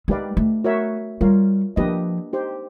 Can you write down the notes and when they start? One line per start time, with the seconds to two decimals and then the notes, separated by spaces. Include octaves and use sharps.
0.08 G#3 D#4 G4 B4 D5 F5
0.37 A3
0.64 F#4 A#4 C#5 E5
1.21 G3 F4 A#4 C#5 F5
1.76 F3 A#3 D4 G4 B4 D#5
2.33 D#4 G4 C5